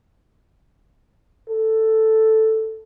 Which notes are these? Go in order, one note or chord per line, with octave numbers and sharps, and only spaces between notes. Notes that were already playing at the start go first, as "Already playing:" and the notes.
A4